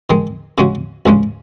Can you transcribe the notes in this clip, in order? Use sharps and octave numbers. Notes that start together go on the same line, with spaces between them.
D#3 G#3 D#4
C#3 G#3 C#4 F#4
C#2 C#3 G#3 C#4